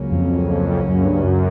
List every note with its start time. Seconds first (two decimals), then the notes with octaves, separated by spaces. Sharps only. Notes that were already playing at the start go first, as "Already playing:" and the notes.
Already playing: C#2 C#3 F#3 A#3 C#4
0.12 F2
0.88 F#2
1.05 G2
1.23 F#2